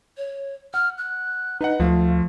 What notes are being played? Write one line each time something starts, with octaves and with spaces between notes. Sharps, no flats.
C#5
F#5 F6
F#6
D#4 B4 D#5 F#5
D2 F3 A3 F4 F5